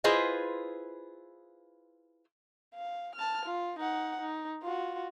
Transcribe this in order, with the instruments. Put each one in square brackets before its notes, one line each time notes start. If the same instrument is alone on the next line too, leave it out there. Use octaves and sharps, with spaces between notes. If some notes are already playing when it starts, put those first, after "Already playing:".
[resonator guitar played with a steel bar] E4 F4 G#4 B4 C5 D#5
[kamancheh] F5
A5 F6
F4
D#4 F#5
D#4
F4 F#4